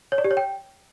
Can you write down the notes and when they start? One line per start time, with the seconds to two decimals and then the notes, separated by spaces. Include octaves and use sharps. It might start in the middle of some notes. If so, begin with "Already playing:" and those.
0.12 C#5
0.18 D5
0.24 G4
0.31 C#5
0.37 G5